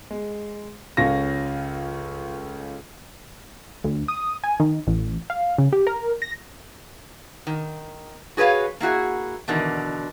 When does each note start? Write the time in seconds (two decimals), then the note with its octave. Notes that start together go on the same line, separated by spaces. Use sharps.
0.11 G#3
0.97 C#2 C#4 F4 A4 F5 A#6
3.84 D2
4.08 D#6
4.44 G#5
4.60 D#3
4.87 A1
5.30 F5
5.58 C#3
5.73 G4
5.87 A#4
6.22 A#6
7.47 D#3
8.37 F#4 G#4 B4 C#5 F5
8.80 A#3 E4 F#4 G#4
9.48 E2 B2 D3 D#3